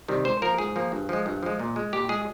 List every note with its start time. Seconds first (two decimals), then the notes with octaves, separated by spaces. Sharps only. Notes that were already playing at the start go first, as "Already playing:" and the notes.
0.08 C3 D#3 G3
0.25 G#2 C5
0.42 F3 A#3 A#4
0.58 G#2 G#4
0.76 F3 A#3
0.92 G2
1.09 F3 G#3
1.26 G2
1.43 F3 G#3
1.59 A#2
1.76 G#3
1.93 A#2 G4
2.09 G#3 G#4